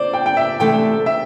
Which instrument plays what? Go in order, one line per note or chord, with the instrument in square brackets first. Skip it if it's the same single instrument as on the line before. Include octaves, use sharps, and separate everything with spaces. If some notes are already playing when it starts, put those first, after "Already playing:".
Already playing: [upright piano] C5 D5
G5
G5
E5
[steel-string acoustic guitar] C3 E3 A3 D4 [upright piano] G5
[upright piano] E5